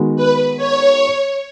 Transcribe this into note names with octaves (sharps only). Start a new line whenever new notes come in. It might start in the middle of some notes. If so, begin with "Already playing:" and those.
Already playing: D#3 G#3 B3 F#4
B4
C#5